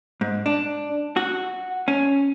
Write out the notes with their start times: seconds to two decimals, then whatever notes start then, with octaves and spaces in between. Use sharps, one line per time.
0.21 G#2
0.46 D4
1.16 F#4
1.88 C#4